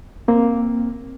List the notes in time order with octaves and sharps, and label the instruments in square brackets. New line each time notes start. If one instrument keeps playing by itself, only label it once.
[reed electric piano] A#3 C4